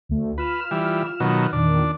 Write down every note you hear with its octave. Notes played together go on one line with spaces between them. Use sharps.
D2 D3 A3
F4 B4 F6 E7
E3 G3
B2 D#3 F#3
E2 A#2 D#3 D4